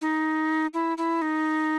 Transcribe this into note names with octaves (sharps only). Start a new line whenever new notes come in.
D#4
E4
E4
D#4